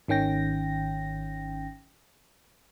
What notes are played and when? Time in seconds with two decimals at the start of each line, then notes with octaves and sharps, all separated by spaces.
0.08 G#1 D#3 C#4 G5 A#6